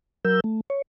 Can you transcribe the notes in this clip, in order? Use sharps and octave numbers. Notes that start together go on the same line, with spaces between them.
F#3 A#4 E6 G6
A3
C#5